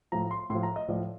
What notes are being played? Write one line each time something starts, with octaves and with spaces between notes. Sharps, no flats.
A2 F3 A#5
C6
A2 F3 C6
A#5
D#5
A2 F3 D5